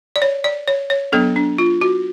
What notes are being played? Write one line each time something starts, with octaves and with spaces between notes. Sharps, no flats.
D5
C#5
D5
C#5
C#5
F#3 B3 D4 A4
D4
F4
F#4